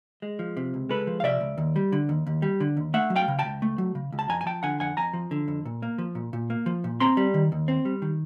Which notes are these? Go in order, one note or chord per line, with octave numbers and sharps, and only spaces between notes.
G#3
F3
C3
C#2
G#3 A4 B4
F3
F5
C3 D5 E5
C#2
D#2
G3
D3
D#2
D#2
G3
D3
D#2
A3 E5 F#5
F#3
F5 G5
C#3
G5 A5
C#2
A3
F#3
C#3
C#2
A5
F2 G#5 A#5
G#5
F3 G5 A5
D3 F#5 G#5
F2 F#5 G#5
F2 G#5 A#5
F3
D3
F2
A#2
A#3
F3
A#2
A#2
A#3
F3
A#2
C4 A#5 C6
G3
D#3
D#2
C4
G3
D#3